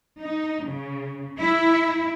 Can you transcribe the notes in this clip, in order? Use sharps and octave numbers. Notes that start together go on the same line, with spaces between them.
D#4
C#3
E4